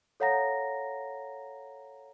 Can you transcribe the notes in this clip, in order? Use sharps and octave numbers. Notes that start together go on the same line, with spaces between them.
A4 C#5 F5 F#5 A#5 A#6